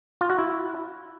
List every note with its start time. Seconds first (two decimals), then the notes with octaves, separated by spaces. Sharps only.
0.21 F4
0.30 F#4
0.39 E4